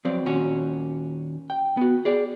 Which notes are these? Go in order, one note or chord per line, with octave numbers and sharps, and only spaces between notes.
F3 F#3 C4 D5
D#2 A#2 C#4 F#4
G5
B3 F#4
G#4 D5